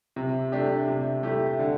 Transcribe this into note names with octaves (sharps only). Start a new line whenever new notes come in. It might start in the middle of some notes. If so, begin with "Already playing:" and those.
C3
A3 D4 G4
C3
A3 E4 G4
D3